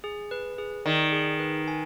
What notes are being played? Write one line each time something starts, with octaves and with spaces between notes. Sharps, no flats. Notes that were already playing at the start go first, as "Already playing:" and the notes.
G#4
B4
G#4
D#3 D5
G#4
B4
G#5